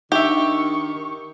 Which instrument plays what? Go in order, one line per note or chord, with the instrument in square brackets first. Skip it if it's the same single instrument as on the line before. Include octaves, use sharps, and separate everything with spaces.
[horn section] D#3 [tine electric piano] D4 D#4 [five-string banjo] G4 E5 [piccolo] C#6